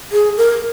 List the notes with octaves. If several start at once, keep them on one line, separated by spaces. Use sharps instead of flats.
G#4
A#4